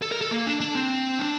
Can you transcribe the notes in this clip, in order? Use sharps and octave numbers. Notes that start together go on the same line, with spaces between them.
A4
A#4
A4
A#3
D4
D4
C4
D4